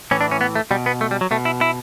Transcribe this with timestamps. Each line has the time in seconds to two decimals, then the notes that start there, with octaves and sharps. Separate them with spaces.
0.11 A2 E3 C#4
0.21 D4
0.31 C#4
0.41 B3
0.55 A3
0.71 B2 G3
0.86 B3
1.01 A3
1.11 G3
1.21 F#3
1.31 B2 A3
1.45 E4
1.61 E4